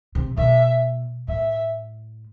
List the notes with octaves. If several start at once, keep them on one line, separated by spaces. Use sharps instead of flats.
C3
B2 E5
A2 E5